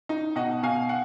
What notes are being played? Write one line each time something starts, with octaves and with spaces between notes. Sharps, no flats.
D#4
B2 D#5 F#5
B2 F5 G#5
F#5